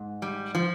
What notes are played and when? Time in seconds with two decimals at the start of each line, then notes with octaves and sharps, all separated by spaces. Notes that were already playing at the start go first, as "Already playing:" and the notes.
Already playing: G#2
0.22 G3
0.55 F3